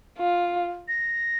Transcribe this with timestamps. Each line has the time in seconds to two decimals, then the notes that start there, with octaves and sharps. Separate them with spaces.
0.18 F4
0.88 A#6